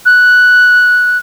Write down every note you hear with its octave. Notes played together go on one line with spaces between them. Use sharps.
F#6